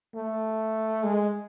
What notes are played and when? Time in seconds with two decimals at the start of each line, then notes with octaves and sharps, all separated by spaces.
0.15 A3
1.03 G#3